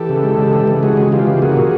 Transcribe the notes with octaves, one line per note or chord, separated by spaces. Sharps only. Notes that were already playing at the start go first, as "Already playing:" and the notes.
Already playing: E3 G4 A4
C#3
G#3
C#3
E3
C#3
G#3 F#4 G#4
C#3
E3 F4 G4
C#3
A#3 F#4 G#4
A#2